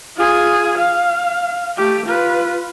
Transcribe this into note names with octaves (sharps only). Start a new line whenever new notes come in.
F4 G#4
F5
A3 G4
F4 B4